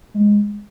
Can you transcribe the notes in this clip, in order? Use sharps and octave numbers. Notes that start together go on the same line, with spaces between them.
G#3